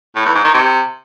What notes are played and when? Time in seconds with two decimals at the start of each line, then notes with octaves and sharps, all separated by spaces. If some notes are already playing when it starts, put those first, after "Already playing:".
0.15 A2
0.25 E2
0.34 G#2
0.44 D#3
0.54 C3